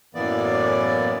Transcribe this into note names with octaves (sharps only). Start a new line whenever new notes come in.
F#2 A2 E3 A#3 B3 D5